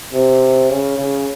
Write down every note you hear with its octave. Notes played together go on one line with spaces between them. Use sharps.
C3
C#3
C#3